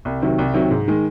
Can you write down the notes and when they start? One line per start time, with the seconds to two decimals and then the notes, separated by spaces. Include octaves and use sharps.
0.05 C2
0.22 C3 D#3 F#3
0.39 C2
0.54 C3 D#3 F#3
0.70 G#2
0.88 D#3 G#3